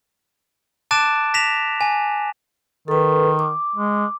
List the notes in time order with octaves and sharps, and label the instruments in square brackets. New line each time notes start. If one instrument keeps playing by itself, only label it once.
[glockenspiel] A5 D6 F#6 A6 D7 E7
A#6 B6 E7 F7
G#5
[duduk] D#3 [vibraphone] A4 B4
[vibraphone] D6
[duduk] G#3